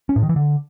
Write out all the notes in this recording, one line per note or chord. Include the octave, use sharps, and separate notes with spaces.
C#4
A2
D#3
E3
D3